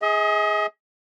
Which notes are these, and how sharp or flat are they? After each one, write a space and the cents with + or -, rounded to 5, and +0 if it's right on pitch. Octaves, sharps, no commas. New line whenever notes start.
G#4 +0 D#5 +40